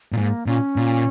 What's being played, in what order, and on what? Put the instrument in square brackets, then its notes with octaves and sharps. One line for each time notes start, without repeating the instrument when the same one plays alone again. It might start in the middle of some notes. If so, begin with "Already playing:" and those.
[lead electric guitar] A#2
[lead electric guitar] G#2 [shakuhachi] A#3
[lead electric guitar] A#2 [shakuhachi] C#4
[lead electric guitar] A#2